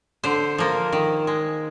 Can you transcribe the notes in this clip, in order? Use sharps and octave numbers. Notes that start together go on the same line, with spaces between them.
D3 C5
F3 A#3
D#3
G#3